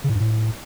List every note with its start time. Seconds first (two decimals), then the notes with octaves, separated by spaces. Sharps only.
0.04 C#3
0.09 A2
0.15 G2
0.20 A2